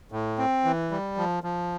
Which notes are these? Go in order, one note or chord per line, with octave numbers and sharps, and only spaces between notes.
A2
C4
E3
G3
F3
F3